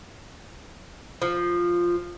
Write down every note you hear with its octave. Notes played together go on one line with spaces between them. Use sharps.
F3